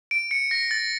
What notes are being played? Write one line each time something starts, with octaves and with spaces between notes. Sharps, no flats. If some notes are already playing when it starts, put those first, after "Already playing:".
D7
C#7
A#6
A6